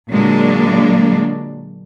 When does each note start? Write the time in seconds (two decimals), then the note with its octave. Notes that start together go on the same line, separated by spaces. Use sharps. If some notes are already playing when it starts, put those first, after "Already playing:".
0.11 A#2 D3 F#3 G#3 A#3 D4